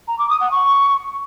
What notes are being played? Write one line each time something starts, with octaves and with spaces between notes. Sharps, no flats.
A#5
D6
D#6
F#5
C#6